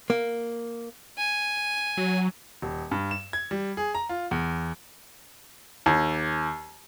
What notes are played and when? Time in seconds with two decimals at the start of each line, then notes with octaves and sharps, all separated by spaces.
0.10 A#3
1.18 G#5
1.97 F#3
2.62 D#1
2.91 G2
3.11 E7
3.33 G#6
3.51 G3
3.77 G#4
3.95 A#5
4.09 F4
4.31 E2
5.86 D#2